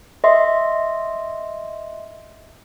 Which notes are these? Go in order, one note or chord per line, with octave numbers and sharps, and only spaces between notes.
D#5 E5 C6